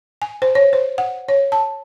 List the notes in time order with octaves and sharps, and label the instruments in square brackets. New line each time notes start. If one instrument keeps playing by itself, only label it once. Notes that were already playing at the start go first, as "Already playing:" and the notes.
[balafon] G#5
C5
C#5
C5
F#5
C#5
A5